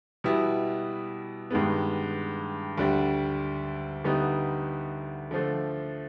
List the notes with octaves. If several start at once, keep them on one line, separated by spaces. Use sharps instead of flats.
B2 G3 B3 E4
G2 D#3 G#3 B3
D2 D3 G3
D2 D3 G3 B3 D#4
D3 F3 A3